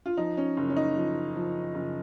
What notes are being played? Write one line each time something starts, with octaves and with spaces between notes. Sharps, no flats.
F4
F3 D#4
C#4
F#1
C#4
D#4
F3
F3
F#1